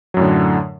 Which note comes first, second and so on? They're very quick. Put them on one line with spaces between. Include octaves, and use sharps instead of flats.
F#3 F#2 A2 D3